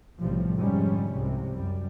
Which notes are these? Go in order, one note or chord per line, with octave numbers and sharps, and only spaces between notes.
B1 A2 C3 F3 G3
F1 G#2 D3 F3 G3 C#4
C2 G#2 C3
F#2 G3